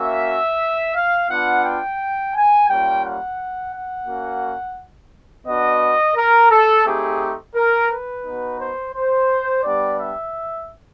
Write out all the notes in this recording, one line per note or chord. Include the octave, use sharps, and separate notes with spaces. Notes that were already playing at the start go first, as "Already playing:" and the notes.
Already playing: A#3 C#4 F#4 E5
F5
B3 D4 F4 F#5
G5
G#5
G3 A#3 C#4 F4 G5
F#5
F#5
A#3 C#4 F#4
B3 D4 F#4 D#5
A#4
A4
A3 C4 D#4 G4 G#4
A#4
B4
B3 D#4 F#4
C5
C5
G3 B3 D4 G4 D5
E5